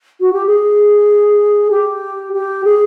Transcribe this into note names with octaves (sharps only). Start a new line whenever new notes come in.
F#4
G4
G#4
G4
G4
G#4